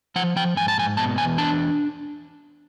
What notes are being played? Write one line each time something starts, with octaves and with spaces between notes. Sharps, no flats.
F3 F#5
F3 G5
G#2 G#5
A5
G#2 G#5
B2 A5
E2 G#5
D4 A5